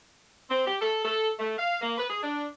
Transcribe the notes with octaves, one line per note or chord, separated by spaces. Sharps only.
C4
G4
A4
A4
A3
F5
A#3
B4
G#4
D4